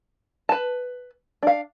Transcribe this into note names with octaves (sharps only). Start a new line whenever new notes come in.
B4 A5
D4 F5